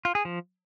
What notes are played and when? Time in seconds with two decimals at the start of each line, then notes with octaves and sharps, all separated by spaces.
0.05 F4
0.15 G#4
0.25 F3